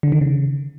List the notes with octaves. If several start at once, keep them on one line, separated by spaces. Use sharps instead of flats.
D3
D#3
C#3